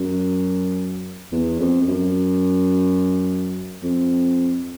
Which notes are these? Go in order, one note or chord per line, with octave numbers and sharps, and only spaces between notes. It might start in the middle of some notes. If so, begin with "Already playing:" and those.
Already playing: F#2
E2
F2
F2
F#2
F2